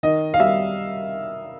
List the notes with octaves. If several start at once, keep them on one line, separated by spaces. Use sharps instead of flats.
D#3 D#5
F5
G3 E5